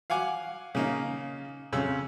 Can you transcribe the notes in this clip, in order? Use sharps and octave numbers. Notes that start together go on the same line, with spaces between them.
F5 F#5 G#5 D6
C#3 A#3 D#4
F2 C#3 E6